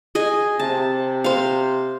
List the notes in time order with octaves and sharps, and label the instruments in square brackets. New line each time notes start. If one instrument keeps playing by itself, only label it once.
[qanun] G#4 D#5 G#5
[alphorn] C3 [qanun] A5
[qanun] C5 F5